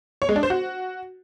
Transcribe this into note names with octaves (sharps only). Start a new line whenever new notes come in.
C#5
G#3
D4
C5
F#4